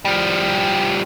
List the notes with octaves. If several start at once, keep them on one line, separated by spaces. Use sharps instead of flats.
F3 G3